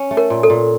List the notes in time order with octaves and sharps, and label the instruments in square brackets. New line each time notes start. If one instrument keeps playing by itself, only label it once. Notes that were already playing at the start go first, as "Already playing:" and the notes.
Already playing: [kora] C#4
A3
[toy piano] A#4
[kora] A#2
[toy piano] A4
[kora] A#2